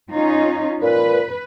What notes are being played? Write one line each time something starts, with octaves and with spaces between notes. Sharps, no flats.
C#4 D#4 F4
A#2 B4